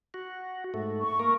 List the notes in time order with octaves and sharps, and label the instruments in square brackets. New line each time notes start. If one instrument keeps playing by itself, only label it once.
[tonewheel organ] F#4
G#2 A3
[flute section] C#6
[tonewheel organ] A#3 A#4